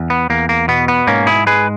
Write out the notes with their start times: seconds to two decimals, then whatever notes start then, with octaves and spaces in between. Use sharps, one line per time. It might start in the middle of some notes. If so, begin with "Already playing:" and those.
Already playing: E2
0.10 B3
0.30 E2 A#3
0.49 A#3
0.68 B2 B3
0.88 B3
1.07 G#2 A#3 C#4
1.27 E4 G#4
1.46 G#3 G#4 B4